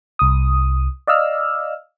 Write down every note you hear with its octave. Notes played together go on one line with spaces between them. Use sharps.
C2 D#6
D5 D#5 F5 E6 F6